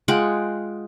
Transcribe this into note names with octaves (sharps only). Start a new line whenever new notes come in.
G#3 F4 F#5 G5